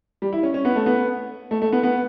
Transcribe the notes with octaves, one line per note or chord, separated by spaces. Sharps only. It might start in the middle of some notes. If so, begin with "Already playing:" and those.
G3
E4
C#4
C#4
B3
A3
B3
A3
A3
B3
B3